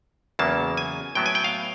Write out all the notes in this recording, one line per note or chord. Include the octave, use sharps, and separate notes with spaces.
E2 C#3 F#3 A#3 A5
G#5
A2 F#3 B3 G5
G#5
G5
F5